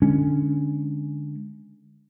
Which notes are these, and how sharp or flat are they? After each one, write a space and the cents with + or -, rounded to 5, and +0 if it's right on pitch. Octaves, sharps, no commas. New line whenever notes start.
D3 +0 G#3 +0 C#4 +0